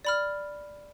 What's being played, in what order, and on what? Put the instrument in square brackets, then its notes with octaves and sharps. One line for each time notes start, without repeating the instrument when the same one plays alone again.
[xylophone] D5 B5 F6